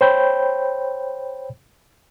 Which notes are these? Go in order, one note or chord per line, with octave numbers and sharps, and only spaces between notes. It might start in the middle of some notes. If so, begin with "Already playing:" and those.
C5 C#5 G5 B5 G6